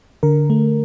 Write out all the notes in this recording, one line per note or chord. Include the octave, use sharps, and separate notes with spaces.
D3 A#4
A3